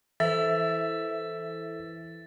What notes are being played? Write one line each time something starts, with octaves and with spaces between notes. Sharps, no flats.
E3 A4 B4 C5 E5 A6